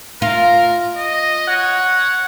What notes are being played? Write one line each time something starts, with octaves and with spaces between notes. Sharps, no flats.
F4 A#4
D#5
C#5 F#5